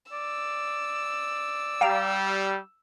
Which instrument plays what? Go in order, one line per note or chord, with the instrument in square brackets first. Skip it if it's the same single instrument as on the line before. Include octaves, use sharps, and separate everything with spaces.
[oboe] D5 [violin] E6
[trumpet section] G3 [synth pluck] F5 G5 A#5